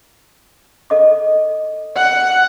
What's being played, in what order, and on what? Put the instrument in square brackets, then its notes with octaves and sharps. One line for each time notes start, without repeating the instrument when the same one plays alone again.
[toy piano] A4 D#5 D6
[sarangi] F#5